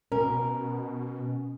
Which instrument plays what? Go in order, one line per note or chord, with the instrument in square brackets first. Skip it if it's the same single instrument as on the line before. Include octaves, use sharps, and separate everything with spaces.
[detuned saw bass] B2 [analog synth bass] C#4 [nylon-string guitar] A#4